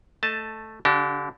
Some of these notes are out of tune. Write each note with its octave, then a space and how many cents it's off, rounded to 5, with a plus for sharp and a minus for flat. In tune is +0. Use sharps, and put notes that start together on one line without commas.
A3 +0 D#5 +0 A5 +0
D3 -40 D4 +0 G4 -40